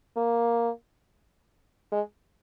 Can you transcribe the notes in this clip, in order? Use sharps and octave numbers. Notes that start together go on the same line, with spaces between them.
A#3
G#3